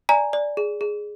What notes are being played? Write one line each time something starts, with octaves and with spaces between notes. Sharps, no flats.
D5 G#5 A#5
D5
G#4
G#4